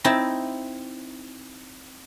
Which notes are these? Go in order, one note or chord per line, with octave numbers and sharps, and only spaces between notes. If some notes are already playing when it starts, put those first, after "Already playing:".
C4 D#4 E4 A5